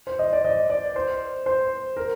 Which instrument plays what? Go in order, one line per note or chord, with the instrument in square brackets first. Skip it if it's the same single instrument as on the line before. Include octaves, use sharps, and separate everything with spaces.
[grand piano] C5
D#5
D5
D#5
D5
C5
C5
A#4